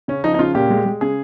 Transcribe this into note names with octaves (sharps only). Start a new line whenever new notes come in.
C#3 C#4
F3 D#4
D#4
C#3 F4
A#2 G4
G#3
G#3
C#3 G#4